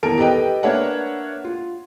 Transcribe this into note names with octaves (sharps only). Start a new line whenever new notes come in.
D#1 E2 A#4 A5 D7
G4 A4 B4 D#5 G5
A#3 D4 B4 C#5 E5 F#5
F4